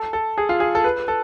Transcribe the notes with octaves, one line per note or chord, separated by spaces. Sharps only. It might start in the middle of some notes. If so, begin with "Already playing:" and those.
Already playing: A4
A4
G#4
F4
G#4
A4
B4
A4